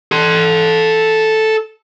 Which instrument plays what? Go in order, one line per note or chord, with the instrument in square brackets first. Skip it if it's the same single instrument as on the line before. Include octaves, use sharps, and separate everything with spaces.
[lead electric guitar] A4 C6